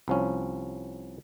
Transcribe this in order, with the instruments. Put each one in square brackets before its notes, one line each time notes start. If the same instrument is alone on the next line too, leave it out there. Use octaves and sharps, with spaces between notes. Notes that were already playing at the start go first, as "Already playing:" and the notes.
[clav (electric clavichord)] C2 F3 C#4